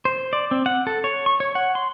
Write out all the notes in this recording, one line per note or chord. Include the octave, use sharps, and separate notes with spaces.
C5
D5
C4
F#5
A4
C#5
C#6
C#5
F#5
C6